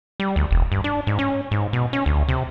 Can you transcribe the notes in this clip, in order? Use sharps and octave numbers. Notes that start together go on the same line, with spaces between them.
G3
D2
E1
G2
D4
G#2
C#4
G#2
B2
C#4
D2
C3